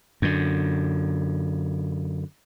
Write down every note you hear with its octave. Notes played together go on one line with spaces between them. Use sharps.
F#2 D3